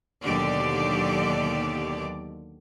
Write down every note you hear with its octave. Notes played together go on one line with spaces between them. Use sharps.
D#2 B2 D3 F#3 G4 D5